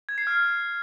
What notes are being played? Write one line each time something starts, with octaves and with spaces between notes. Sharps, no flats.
G#6
C7
F6